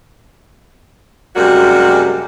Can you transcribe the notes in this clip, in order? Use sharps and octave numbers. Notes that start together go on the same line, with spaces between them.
F#2 C3 G3 G#3 A#3 F#4